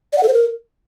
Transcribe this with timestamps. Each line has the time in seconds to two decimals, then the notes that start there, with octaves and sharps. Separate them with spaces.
0.13 D5
0.18 F#5
0.23 A4
0.28 C5
0.34 A#4